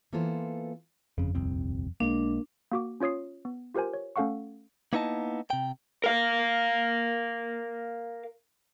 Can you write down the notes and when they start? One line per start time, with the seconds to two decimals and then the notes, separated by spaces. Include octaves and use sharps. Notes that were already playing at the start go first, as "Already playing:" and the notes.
0.13 E3 A#3 B3 F4 A4 C5
1.18 G1 F2 C#3
1.35 D#1 C2 C4
2.00 B1 G#3 A#3 D4
2.72 A#3 F#4 D6
3.00 C#4 F4 C#5 D#6 C7
3.45 B3
3.75 F4 G4 A#4 C5 G#5
3.94 C#5
4.16 A3 C#4 A4 F5 F#5 C#6
4.93 A#3 B3 D#4 E4 D#5 A5
5.50 C3 G5
6.04 A#4 F5